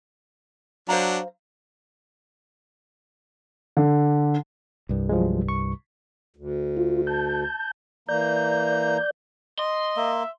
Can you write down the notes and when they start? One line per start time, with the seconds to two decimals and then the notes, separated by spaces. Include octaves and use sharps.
0.89 F#3 D4 C5 F5 A#5
3.77 D3
4.89 C2 G2
5.09 F3 F#3 G#3
5.49 C#6
6.36 D2
6.77 F4
7.07 A5 G6
8.09 E3 A#3 D5 A#5 G6
9.59 D#5 C6
9.97 A#3 E5